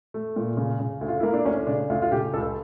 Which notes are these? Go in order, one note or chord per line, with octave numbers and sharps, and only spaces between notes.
A3
A#2
C#3
C#3
D2
F4
A#3 E4
D4
D2 C#4
C#3 D4
D2 F4
F4
C#3 G4
C#2 A4